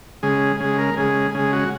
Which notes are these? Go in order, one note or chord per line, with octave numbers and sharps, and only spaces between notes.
C#3 G#3 G#4
C#3 G#3 G#4
A#4
C#3 G#3 G#4
C#3 G#3 G#4
F#4